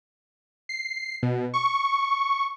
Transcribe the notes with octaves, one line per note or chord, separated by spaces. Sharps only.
C7
B2
C#6